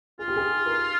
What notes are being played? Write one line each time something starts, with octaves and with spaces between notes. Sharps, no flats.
F4 G#4
G4
G#4
A#4